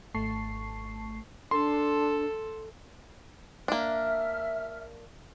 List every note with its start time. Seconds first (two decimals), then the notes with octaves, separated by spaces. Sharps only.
0.15 G#1 A3 A5 C#6 C7
1.51 D4 A4 C6
3.68 A#3 D4 E5 F6